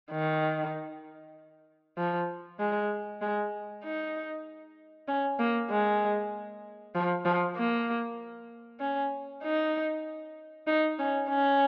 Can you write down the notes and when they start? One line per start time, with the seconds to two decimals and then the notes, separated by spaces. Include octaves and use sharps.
0.11 D#3
1.98 F3
2.59 G#3
3.21 G#3
3.84 D#4
5.08 C#4
5.39 A#3
5.71 G#3
6.95 F3
7.25 F3
7.56 A#3
8.80 C#4
9.43 D#4
10.67 D#4
10.99 C#4
11.29 C#4